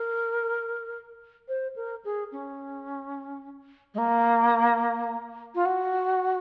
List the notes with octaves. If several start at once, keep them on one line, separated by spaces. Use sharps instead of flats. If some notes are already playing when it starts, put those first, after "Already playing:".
Already playing: A#4
C5
A#4
G#4
C#4
G#3
A#3
F4
F#4